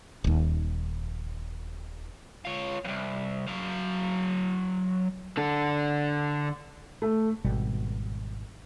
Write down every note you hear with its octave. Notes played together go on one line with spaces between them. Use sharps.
D#1 D#2
F4 C#5
C2 F2
F#3 F5
D3 A4
A3
G#1 B2 G3